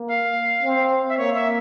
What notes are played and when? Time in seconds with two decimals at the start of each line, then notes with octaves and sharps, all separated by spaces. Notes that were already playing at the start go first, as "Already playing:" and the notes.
Already playing: A#3
0.08 F5
0.62 C4
1.09 E5
1.18 A#3 C#5
1.35 E5